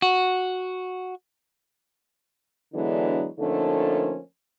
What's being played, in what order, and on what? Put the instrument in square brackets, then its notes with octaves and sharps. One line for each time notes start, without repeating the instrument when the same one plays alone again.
[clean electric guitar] F#4
[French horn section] D3 E3 F#3 G#3 B3 D4
D3 F3 A3 A#3 C#4 D#4